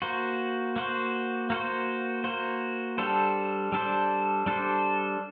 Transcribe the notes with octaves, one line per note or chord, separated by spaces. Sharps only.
A#3 F#4 C5
A#3 F#4 C5
A#3 F#4 C5
A#3 F#4 C5
G3 D4 A4 C5
G3 D4 A4 C5
G3 D4 A4 C5